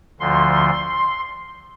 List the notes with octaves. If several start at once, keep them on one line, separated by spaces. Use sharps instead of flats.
D2 D3 F3 C6